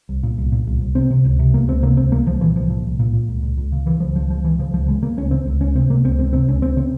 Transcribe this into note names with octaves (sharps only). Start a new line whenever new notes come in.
C2
A#2
C2
A#2
C2
C2
C3 C4
C3
C#2
C3
C#2 A#3
C#2 C4
C3 A#3
C#2 C4
C2 A#3
C2 F3
A#2 E3
C2 F3
A#2
C2
A#2
A#2
C#2
C#2
C#2
C#3
C#3 E3
C#2 F3
C#2 F3
C#2 F3
C#2 E3
C#3 F3
C#2 F3
C#3 G#3
C#3 A#3
C#2 C#4
C#3 C4
C#2
C#2 C#4
C3 C4
C3 A#3
C#2 C4
C#2 C4
C3 C4
C#2 C#4
C#2 C4
C#3 C4